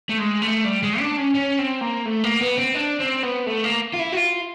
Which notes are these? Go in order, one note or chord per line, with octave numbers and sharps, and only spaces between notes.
A3
G#3
A3
G3
G#3
D4
C#4
C#4
C4
A#3
A3
A#3
B3
C4
D4
C4
B3
A3
A#3
F4
E4
F#4
F4